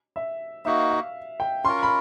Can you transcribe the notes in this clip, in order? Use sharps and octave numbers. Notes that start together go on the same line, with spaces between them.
E5
A#3 D#4 F#4 E5
F5
G5
C#4 F4 A#4 C6
B5